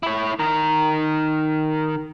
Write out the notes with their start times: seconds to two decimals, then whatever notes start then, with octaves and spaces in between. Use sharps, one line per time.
0.03 E4 C#5
0.39 D#3 A#4